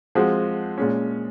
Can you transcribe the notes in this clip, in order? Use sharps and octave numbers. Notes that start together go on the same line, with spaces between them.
F3 G#3 C4 F#4
A#2 G#3 C#4